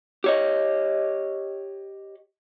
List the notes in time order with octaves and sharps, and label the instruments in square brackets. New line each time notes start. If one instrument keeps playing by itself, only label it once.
[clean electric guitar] G4 C#5 D#5